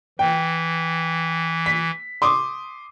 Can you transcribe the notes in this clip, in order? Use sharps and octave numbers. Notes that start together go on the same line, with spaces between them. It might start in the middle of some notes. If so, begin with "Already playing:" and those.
E3 G5
B6
C6 D6 D#6